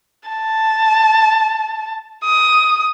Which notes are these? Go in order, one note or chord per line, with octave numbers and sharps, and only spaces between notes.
A5
D#6